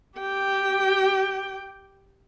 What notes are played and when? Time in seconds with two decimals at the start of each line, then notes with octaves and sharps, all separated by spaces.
0.19 G4 G5